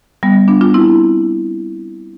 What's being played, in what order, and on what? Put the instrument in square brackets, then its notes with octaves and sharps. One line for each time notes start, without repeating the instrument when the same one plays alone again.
[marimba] G3 B3
B3 D4
D4 F4
C4 E4